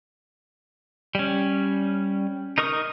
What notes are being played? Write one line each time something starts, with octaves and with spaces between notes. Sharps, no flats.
G3 C#4
D#4 A#4 C#6 D#6